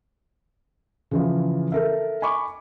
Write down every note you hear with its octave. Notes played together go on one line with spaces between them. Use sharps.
C#3 E3 F3
A4 A#4 E5
G#5 B5 C#6 D6